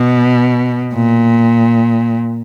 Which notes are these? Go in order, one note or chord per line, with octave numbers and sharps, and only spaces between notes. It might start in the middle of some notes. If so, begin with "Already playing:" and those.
Already playing: B2
A#2